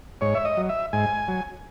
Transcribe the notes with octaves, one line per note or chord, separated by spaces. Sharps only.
G#2 C#5
E5
D#5
F#3
E5
G#2 G#5
F#3